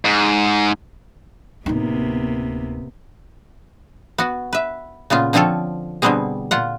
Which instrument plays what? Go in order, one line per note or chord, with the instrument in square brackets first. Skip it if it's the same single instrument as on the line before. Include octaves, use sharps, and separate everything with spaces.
[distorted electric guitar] G#2
[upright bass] D1 D#4 [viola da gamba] C3 A#3 B3
[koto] B3 F#4
B4 E5
A#2 C#3 B3 F4
D3 F3 C4 F4 A4 C#5
B2 D3 G3 B3 C4 G#4
A#2 F4 F#5